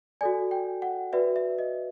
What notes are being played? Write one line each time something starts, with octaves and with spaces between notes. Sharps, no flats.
F#4 A4 D5 G#5
G5
F#5
F#4 B4 D5 E5
E5
D#5